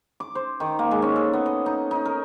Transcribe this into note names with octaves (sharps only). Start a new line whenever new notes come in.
D6
C5
D#3
A#3
G#3
C#4
A4
B3
D#5
D#4
D#4
A#4